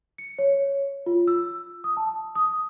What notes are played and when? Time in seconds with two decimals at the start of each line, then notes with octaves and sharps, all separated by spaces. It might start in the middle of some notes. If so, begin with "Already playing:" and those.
0.18 C#7
0.39 C#5
1.06 F4
1.28 E6
1.84 D#6
1.97 A5
2.35 D#6